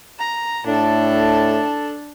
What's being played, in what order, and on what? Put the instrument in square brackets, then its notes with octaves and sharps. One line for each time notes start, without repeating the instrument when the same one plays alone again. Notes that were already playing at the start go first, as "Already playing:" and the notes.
[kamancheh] A#5
[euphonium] A2 [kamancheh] D4 A4